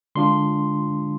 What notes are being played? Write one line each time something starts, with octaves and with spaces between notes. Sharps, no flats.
D3 G#3 D4 F4 C6